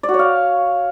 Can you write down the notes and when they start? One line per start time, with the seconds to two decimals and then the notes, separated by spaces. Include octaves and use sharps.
0.03 D5
0.09 F#4
0.14 C#5
0.19 F5